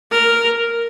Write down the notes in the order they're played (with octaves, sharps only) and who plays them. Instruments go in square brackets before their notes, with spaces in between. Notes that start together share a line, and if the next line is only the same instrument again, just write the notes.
[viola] A#4